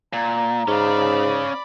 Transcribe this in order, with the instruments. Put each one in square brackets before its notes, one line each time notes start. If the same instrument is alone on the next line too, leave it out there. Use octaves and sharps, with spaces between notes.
[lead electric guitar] A#2 [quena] A#5
[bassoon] G#2 [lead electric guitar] C#4 F5 [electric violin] D5 B5